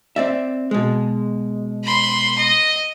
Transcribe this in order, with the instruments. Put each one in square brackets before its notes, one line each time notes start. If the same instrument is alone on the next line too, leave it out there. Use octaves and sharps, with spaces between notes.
[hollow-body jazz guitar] C4 D5 E5
B2 G#3
[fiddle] B5 C6
D#5